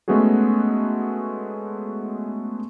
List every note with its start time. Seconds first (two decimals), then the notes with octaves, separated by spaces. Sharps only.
0.08 G#3 A3 B3 C#4 F#4 G#4